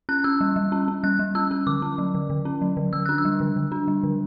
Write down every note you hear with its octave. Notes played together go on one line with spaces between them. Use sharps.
C#4 F#6
C#4 E6
G3
G3
C#4
C#4
G3 F#6
G3
C#4 E6
C#4
D3 D6
C#4
F#3
D3
D3
C#4
F#3
D3
D3 E6
D4 F#6
E6
G3
D3
D3
D4
G3
D3